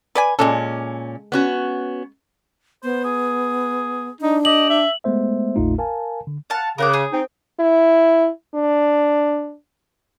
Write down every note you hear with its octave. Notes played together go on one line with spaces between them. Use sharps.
B4 D5 G#5
A#2 G#3 C#4 A4
B3 C#4 F#4
B3 C5
G#4
D4 D#4
G4 D#5 F#7
E5
G#3 A3 B3 C5 E5
G#1 D#2 A2 A3 D#4 F4
A#4 F5 G#5 A5
D3
F5 F#5 A5
C#3 A#4 F#5 D6
G#4
C4 D#4 G5
E4
D4